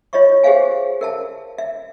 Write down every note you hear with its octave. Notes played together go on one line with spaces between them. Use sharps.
F4 C#5 D#5 E5 C#6
G4 G#4 C5 E5 F5 G#5
A#4 E5 A5
E5